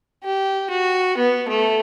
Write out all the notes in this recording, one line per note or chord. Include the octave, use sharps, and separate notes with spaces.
G4
F#4
B3
A3